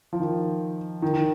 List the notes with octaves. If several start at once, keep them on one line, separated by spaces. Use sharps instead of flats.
F3
D#3
D#3
D#3